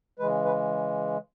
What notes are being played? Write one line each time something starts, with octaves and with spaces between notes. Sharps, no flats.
C#3 E3 G#3 B4
B4